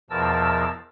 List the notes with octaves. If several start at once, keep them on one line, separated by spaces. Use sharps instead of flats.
E2 B2 F3 A#4 A5 E6